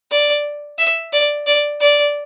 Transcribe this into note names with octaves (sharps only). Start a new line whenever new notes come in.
D5
E5
D5
D5
D5